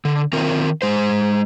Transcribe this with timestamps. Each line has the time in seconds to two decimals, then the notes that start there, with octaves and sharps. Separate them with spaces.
0.05 D3
0.33 D#3 C4 F4 A#4
0.82 G#3 C5